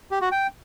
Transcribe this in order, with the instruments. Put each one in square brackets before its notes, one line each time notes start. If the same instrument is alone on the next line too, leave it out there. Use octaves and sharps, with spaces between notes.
[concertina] G4
F#4
G5